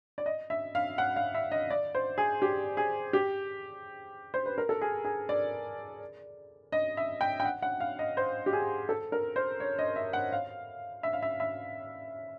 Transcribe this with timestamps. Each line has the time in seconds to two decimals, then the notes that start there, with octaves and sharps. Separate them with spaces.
0.18 D5
0.26 D#5
0.50 E5
0.75 F5
0.98 F#5
1.16 F5
1.35 E5
1.51 D#5
1.70 D5
1.95 C5
2.18 G#4
2.42 G4
2.77 G#4
3.13 G4
4.34 C5
4.46 B4
4.58 A#4
4.69 A4
4.81 G#4
5.05 G#4
5.29 D5
6.72 D#5
6.97 E5
7.21 G5
7.40 G5
7.45 F#5
7.62 F#5
7.80 F5
7.99 D#5
8.17 C5
8.46 G4
8.53 G#4
8.89 A4
9.12 A#4
9.36 C5
9.60 C#5
9.79 D#5
9.96 E5
10.13 F#5
10.33 F5
11.03 E5
11.13 F5
11.22 E5
11.40 E5